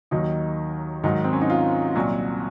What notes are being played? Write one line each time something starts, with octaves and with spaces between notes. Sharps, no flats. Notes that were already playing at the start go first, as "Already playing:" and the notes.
D#2 D#3 F#3 D#4
G#2 D#3 F#3 D#4
C4
C#4
D#4
F4
C2 A#2 F#3 F#4